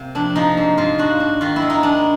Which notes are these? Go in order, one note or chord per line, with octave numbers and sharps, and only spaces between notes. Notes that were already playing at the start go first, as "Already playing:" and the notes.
Already playing: C3 A#3
F2 D4
F3 D#4
G#2
G#2 F4
D4 F#4
D4
D#3 F4
E4
G#3
D#4
G#3 D4